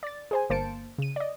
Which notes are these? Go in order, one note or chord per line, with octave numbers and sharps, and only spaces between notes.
D5 A6
G#4 C5 G#5
G1 A#3 C5 A5 C#7 D7
C#3 D#7
D5 D#5